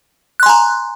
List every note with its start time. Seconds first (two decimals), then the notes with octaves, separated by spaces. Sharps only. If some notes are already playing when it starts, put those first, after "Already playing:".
0.40 F#6
0.43 C6
0.46 G#5
0.49 A#5